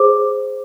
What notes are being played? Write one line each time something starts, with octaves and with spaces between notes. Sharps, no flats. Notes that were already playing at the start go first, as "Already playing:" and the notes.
Already playing: G#4 C5 D6